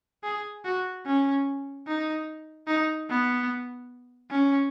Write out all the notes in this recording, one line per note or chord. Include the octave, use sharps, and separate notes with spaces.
G#4
F#4
C#4
D#4
D#4
B3
C#4